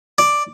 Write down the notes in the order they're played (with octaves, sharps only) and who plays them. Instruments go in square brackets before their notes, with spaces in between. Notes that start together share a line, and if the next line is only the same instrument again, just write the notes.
[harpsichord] D5